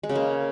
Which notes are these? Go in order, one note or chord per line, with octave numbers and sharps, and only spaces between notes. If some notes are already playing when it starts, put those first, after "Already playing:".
G#3
C#3
A#3